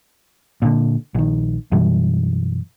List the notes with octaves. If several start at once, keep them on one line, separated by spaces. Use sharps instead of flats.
A#2 D3
A#1 D#3
F#2 B2 E3 G3